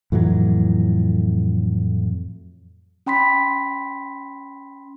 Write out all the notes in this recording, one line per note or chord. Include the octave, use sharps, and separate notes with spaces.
F2 A2 E3 F#3
C#4 G5 B5 C6 B6